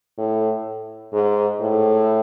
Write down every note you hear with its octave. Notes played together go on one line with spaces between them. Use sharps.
A2
G#2
A2